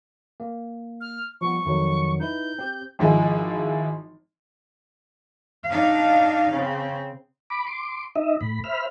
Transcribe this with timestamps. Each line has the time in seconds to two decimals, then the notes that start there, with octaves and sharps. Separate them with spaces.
0.40 A#3
1.01 F6
1.41 F3 G3 B3 C#6
1.65 F2 D#3 F#3
2.20 D#4 E4 B4 G6
2.58 C4 G4
2.99 G#1 F3 G#3 E4 G#5
5.69 D4 D#4 F5
6.51 C#3 C4
7.50 B5 D6
7.67 C6 D6
8.15 D#4 D#5 E5
8.41 A2 B5
8.64 C5 E5 B5 F6